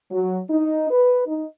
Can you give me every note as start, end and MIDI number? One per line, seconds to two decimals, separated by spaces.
0.10 0.39 54
0.50 0.87 63
0.91 1.24 71
1.26 1.44 63